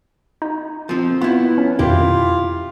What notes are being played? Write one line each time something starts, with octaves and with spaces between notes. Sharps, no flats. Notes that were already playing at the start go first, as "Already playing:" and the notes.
D#4
F3 C4
B3 E4 F4
C#4
F2 B2 D#3 E4 F4 G4